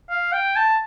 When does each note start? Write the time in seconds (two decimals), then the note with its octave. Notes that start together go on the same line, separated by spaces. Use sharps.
0.10 F5
0.33 G5
0.56 A5